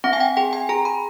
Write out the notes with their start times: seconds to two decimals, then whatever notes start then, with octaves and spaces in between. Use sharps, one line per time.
0.04 C4 F#5
0.13 G#5
0.20 G5
0.37 G#4 G5
0.53 G#5
0.69 G#4 A#5
0.85 B5